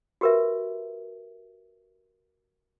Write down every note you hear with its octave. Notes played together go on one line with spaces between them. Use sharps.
F#4 G4 A#4 B4 E5